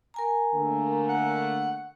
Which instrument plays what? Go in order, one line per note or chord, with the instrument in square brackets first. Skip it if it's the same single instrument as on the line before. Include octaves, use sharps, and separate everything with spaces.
[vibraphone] A#4 G#5 A#5
[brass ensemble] D3 A3 A#3
[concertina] F#5